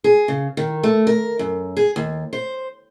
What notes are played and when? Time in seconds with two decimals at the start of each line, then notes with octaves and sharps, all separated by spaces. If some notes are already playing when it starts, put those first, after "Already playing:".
0.04 G#4
0.28 C#3
0.57 D#3
0.83 A3
1.07 A#4
1.39 F#2
1.77 G#4
1.96 D#2
2.33 C5